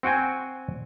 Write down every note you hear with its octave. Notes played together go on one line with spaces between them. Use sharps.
C4 F#4 G5 G#5